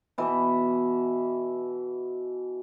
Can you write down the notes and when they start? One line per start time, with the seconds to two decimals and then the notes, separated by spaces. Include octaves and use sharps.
0.18 B2 E3